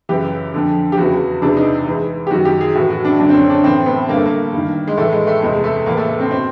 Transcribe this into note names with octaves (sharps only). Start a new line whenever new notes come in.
F#2 C#3 E3 G4
F2 D3
G4
E2 C#3 E3 F#4
E2 C3 E3 D4
D#4
G#2 E3
G4
F#2 D#3 F#4
G4
G#4
A2 E3 F#4
F#4
D4
F#2 D3 D4
C4
C#4
C#4
D4
A2 E3 C4
B3
G2 D3 A#3
A3
A#3
G2 D#3
G#3
A2 E3 A3
G#3
A3
E2 C3 E3 G#3
A3
A2 E3 A#3
A3
A3
C4
B2 C4